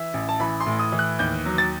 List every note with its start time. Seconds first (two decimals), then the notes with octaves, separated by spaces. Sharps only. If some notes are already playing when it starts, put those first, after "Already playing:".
Already playing: E3 E5
0.14 A1
0.29 A5
0.40 E3 B5
0.61 C6
0.67 A2
0.79 D#6
0.92 E3
0.99 F#6
1.19 D#2 G6
1.45 F#3
1.58 A6